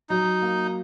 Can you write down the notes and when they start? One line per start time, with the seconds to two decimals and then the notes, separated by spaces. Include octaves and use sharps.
0.09 F#3 D#4
0.42 A#3